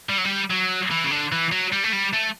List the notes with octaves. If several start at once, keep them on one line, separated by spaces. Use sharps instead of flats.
G3
F#3
G3
F#3
E3
C#3
D3
E3
F#3
G3
A3
G3
A3